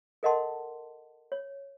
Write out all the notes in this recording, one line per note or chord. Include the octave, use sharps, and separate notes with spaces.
A4 A#4 D#5 F#5 A5 C6
C#5